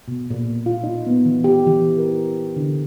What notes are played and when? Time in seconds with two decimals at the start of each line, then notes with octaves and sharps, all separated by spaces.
0.08 B2
0.30 A#2
0.66 F4
0.84 D#4
1.07 B3
1.25 E3
1.44 G4
1.67 E3
1.98 A#4
2.56 D3